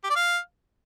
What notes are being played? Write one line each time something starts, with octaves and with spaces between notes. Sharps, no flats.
G4
D5
F5